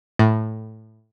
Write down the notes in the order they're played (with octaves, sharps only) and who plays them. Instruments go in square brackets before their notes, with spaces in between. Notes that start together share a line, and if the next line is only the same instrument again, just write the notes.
[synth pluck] A2